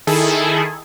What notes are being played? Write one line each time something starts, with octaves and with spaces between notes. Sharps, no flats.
D#3 E4 G#4 A4